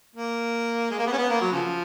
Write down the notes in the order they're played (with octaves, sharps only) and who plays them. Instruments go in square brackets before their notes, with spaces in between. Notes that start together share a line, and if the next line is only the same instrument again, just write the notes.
[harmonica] A#3
G#3
A#3
B3
C#4
B3
A#3
F#3
C#3 F3